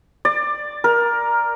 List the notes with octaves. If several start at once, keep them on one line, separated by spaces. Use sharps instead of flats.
D5
A#4